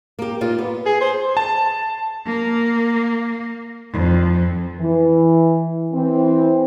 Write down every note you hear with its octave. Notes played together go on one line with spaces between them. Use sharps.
A#3 G4
A#2 D#4 F4
B3
G#4
C5
A5
A#3
F2
E3
E3 C4